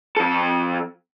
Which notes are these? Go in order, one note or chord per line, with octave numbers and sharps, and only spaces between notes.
F2 A4